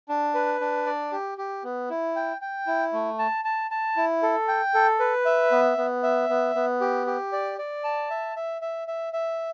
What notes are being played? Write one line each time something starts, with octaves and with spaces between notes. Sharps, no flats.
D4
B4
D4
D5
G4
G4
B3
E4
G5
G5
E4
A3
A5
A5
A5
E4
A4
G5
A4
B4
E5
B3
B3
E5
B3
B3
G4
G4
D5
D5
A5
E5
E5
E5
E5
E5